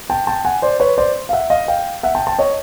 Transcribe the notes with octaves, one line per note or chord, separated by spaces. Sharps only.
G5 A5
G5 A5
F#5 G#5
C5 D5
B4 C#5
C5 D5
F5
E5 F#5
D#5 F5
F5 G5
E5 F#5
G5 A5
G5 A5
C#5 D#5